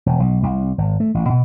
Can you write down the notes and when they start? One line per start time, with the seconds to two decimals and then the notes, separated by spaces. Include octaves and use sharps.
0.06 E1
0.20 B1
0.43 C2
0.78 G#1
1.00 A3
1.14 A1
1.29 B2